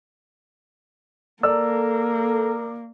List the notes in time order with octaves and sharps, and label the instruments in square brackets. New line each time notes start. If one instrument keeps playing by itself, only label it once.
[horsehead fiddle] A#3 [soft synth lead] A4 [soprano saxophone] A#4 [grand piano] D5 E6